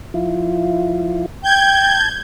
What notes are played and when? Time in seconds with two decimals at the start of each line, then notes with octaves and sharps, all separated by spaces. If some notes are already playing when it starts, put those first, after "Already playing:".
0.14 F3 E4 F4
1.43 G5 G6 G#6
1.75 A5